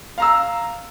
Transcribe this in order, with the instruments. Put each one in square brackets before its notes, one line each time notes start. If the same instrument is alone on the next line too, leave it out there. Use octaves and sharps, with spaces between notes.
[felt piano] F5 A#5 E6